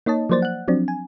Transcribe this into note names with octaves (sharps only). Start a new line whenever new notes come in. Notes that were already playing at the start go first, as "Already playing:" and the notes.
A#3 D#4 C#5 D#5 A5
F3 F#3 A#3 C5 D5 A6
F#5 F#6
F3 F#3 C4 D4
G#5